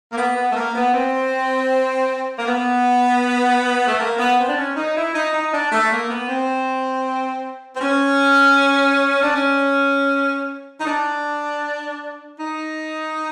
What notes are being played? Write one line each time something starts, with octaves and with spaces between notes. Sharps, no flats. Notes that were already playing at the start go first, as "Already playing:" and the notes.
A#3
B3
B3
A3
A#3
B3
C4
A#3
B3
A3
A#3
B3
C4
D4
C#4
D#4
E4
D#4
D#4
D4
A3
A#3
B3
C4
C4
C#4
D4
C#4
D#4
D4
D#4